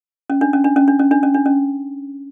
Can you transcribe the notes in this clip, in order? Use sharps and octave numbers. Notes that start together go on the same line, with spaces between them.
C#4
D4
C#4
D4
C#4
D4
C#4
D4
C#4
D4
C#4